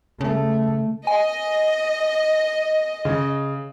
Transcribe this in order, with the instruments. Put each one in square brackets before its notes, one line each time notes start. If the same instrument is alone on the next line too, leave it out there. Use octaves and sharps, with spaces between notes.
[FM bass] C#3 [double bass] A3
[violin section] D#5 [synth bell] G#5
[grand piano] C#3